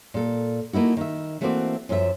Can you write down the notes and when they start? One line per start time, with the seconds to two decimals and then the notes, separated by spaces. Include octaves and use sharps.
0.14 A#2 A4
0.73 A3 A#3 D#4 E4 F#4
0.97 D#3 E5
1.41 E3 A3 A#3 C4 F#4 D5
1.89 F#2 F3 F#3 A4 E5